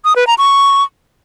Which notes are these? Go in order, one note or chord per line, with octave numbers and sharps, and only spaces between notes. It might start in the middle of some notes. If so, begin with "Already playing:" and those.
D#6
B4
A#5
C#6